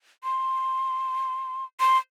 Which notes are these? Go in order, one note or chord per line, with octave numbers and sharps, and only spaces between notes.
C6
C6